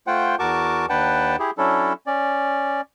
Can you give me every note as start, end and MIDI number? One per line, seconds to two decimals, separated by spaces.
0.07 0.36 57
0.07 0.36 65
0.07 0.36 72
0.07 0.36 78
0.07 0.36 79
0.39 0.86 40
0.39 0.86 66
0.39 0.86 70
0.39 0.86 81
0.39 0.86 85
0.39 0.86 86
0.89 1.36 39
0.89 1.36 62
0.89 1.36 71
0.89 1.36 78
0.89 1.36 79
0.89 1.36 81
1.39 1.51 64
1.39 1.51 67
1.39 1.51 68
1.58 1.93 54
1.58 1.93 61
1.58 1.93 62
1.58 1.93 64
1.58 1.93 69
2.07 2.81 61
2.07 2.81 74